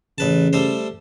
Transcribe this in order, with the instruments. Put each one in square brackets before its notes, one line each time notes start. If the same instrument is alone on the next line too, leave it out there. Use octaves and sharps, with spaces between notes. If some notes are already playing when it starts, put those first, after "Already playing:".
[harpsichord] A1 B4 A5 [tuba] C#3
[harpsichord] G3 A3 C5